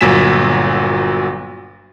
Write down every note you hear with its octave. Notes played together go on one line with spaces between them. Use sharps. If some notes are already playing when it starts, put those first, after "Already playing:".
G1 A#2 F#3 G#5 B6 E7